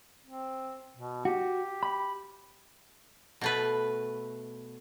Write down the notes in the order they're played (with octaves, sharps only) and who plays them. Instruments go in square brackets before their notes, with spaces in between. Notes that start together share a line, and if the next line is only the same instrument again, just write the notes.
[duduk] C4
B2
[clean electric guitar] F#4 [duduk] G4
[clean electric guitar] B5
[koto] B2 A3 B4